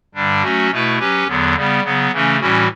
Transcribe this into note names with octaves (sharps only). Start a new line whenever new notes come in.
G2 D3 G3 D4
F#3 A3 C#4 F#4
B2 A3 E4 B4
F#3 C#4 G4 B4
E2 D3 F#3 B3
C#3 G3 B3
C#3 F#3 B3
C#3 E3 A3 C#4
A2 E3 G3 C#4 F#4